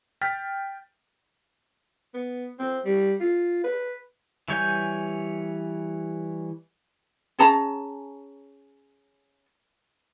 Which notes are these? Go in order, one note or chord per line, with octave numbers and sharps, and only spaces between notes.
G5 F6 A6 B6
B3
C4
G3
F4
B4
E3 G3 C#5 G#5 G6
C#4 G#4 A5 A#5